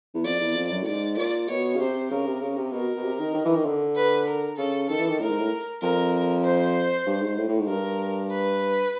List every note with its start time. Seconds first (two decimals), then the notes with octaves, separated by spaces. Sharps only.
0.15 E2
0.25 F2 D5
0.40 E2
0.55 F2
0.71 F#2
0.82 A2
0.86 G#2 D5
1.17 A#2 D5
1.48 B2 C#5
1.75 C#3
1.79 C3 C5
2.10 C#3 A#4
2.26 C3
2.41 C#3
2.57 C3
2.72 B2 A#4
2.97 B2
3.03 C3
3.19 D#3
3.34 D#3
3.45 E3
3.55 D#3
3.66 D3
3.96 B4
4.27 A#4
4.58 C#3 A4
4.89 D#3 A4
4.99 E3
5.09 D#3
5.20 A2 A#4
5.29 G#2
5.38 A2
5.82 F2 A#4
6.45 C5
7.06 G2
7.22 G#2
7.37 A2
7.48 A2
7.59 G#2
7.67 G2 A#4
8.30 B4